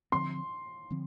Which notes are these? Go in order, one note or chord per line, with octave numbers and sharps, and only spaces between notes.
D3 F3 C4 C6
D3 F3 C4